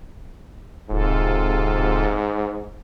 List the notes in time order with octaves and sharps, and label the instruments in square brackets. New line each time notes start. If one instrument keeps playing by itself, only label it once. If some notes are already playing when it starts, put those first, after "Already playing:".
[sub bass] D1 [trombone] G#2 [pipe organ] C3 F4 A4